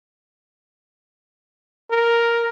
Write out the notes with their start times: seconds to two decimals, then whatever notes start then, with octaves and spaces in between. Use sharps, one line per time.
1.91 A#4